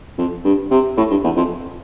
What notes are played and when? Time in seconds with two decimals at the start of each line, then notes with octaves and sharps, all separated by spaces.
0.18 F2
0.44 G2
0.71 C3
0.97 A2
1.10 G2
1.24 E2
1.36 F2